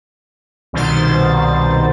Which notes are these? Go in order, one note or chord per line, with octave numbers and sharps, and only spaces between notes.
C2 B2 D#3 C5 A6